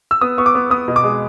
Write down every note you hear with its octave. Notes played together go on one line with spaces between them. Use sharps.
E6
B3 D#6
B3 C#6
D6
B3
B3 D#6
B2
D6
G#3